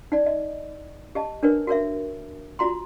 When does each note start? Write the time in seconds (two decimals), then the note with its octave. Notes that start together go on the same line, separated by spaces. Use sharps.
0.12 D#4 D5
0.26 D#5
1.15 G4 D#5 A5
1.43 D4 A#4 B4 C#5
1.67 F#4 A#4 C#5 E5
2.59 F4 F#4 A#5 C6